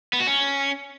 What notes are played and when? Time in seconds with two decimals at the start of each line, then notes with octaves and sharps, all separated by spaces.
0.13 B3
0.20 F#4
0.27 C#4